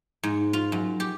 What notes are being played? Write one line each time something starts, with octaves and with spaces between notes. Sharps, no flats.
G#2
F4
F#2
G4